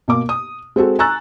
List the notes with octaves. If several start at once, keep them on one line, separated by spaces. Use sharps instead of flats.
B2 A#3 D6
D#6
G#3 C4 F#4 A4
G#5 A#5 C#6 E6 F#6 A6